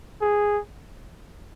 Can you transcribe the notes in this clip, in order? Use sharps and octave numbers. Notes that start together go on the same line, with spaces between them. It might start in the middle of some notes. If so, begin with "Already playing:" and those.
G#4